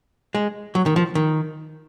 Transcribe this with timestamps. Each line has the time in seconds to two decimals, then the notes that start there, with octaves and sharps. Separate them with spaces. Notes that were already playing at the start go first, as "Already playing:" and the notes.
0.35 G#3
0.75 F#3
0.86 D#3
0.96 F3
1.15 D#3